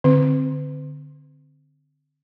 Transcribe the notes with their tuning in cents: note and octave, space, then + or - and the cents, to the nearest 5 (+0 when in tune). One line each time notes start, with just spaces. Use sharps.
D3 +0 C4 +0